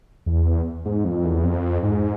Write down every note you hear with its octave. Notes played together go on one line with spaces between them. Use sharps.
E2
G#2
F2
E2
F2
G#2